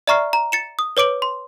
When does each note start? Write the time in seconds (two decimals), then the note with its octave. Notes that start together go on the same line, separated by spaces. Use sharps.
0.08 D5 E5 A#5 C#6 F6 C7
0.33 A#5
0.52 A6 C#7 E7
0.79 D#6
0.97 B4 C#5 D6 D7 F#7
1.22 C6